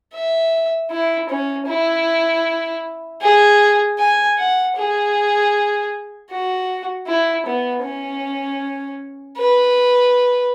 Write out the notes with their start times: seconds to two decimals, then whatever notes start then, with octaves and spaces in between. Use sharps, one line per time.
0.14 E5
0.91 E4
1.29 C#4
1.68 E4
3.23 G#4
3.99 G#5
4.38 F#5
4.77 G#4
6.31 F#4
7.07 E4
7.46 B3
7.83 C#4
9.37 B4